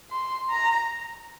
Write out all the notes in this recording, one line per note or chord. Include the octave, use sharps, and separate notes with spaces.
C6
A#5